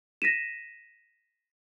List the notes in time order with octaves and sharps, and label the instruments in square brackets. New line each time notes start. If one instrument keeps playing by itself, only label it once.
[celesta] A#6 B6 D#7 E7